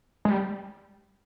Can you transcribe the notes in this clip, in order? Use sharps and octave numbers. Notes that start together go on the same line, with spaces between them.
G#3
G3